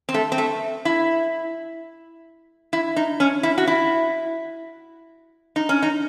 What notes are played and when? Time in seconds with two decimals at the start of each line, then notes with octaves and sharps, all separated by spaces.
0.09 C4
0.14 A3
0.32 C4
0.38 A3
0.85 E4
2.73 E4
2.96 D#4
3.20 C#4
3.43 E4
3.58 F#4
3.67 E4
5.56 D#4
5.69 C#4
5.83 D#4